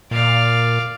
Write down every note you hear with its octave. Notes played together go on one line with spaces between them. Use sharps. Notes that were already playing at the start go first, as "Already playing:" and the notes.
A#2 D5 F5